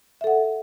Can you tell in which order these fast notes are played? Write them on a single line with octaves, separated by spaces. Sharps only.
E5 A4 F#5